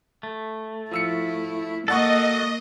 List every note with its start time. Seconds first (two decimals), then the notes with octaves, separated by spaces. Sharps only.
0.23 A3
0.91 F3 E4 E6 C#7
1.88 A#3 F#4 A4 D5 D#5 F#5 C#6